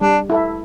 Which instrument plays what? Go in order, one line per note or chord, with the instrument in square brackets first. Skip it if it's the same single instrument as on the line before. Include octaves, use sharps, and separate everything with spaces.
[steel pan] G3 [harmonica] D4
[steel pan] E4 A4 E5